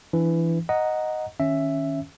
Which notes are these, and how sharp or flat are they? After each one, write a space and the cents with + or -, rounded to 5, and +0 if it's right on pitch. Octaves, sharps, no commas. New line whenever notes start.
E3 +15 D4 +0
D#5 +0 F#5 +0 A#5 +0
D#3 +5 C#4 +0 E5 +5